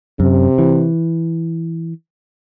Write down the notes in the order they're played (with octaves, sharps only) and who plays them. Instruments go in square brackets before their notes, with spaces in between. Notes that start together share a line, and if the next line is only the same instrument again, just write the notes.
[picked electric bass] F#2 [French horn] C3
[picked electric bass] E3